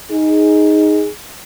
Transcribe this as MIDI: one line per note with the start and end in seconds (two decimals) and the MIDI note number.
0.11 1.07 63
0.11 1.07 68